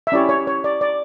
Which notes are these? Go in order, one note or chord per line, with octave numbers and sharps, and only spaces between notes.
E5
C#4 E4 G4 C#5 D5
C#5
C#5
D5
D5